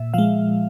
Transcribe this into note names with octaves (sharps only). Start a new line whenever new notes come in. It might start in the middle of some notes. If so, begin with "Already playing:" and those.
Already playing: A#2 E5
F3 G#3 F5